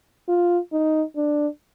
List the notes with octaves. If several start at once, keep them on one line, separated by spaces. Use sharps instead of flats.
F4
D#4
D4